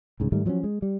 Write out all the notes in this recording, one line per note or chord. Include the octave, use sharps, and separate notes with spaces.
C2 G#2 C#3
G#2 D#3 G3 A3
F3 F#3 A#3 C#4
G#3
G3